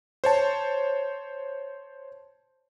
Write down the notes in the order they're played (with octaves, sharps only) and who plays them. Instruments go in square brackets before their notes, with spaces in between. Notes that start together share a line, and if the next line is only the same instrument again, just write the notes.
[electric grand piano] C5 C#5 A5